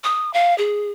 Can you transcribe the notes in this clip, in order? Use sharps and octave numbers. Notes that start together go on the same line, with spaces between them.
D#6
F5
G#4